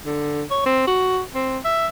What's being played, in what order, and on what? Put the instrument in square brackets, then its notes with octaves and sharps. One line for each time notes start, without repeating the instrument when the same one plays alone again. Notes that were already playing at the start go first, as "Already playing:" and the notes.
[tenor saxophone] D3
C#5
C4
F#4
C4
E5